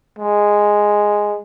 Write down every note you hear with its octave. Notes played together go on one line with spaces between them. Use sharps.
G#3